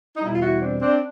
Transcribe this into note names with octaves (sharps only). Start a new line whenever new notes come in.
D#4
E2 B2 G3 E4
F4
E4 F#4
C4 D4
C4 D4